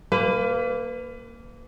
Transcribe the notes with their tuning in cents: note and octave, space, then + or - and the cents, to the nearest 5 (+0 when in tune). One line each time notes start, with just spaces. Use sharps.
A#3 -10 B4 +30